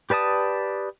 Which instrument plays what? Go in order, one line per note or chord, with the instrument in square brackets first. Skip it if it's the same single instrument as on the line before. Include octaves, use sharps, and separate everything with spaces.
[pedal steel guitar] G4 B4 D5 A5 D#6